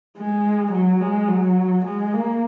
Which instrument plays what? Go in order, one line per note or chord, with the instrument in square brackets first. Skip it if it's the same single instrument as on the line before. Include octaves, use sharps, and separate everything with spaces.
[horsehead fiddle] G#3
F#3
G#3
F#3
G#3
A#3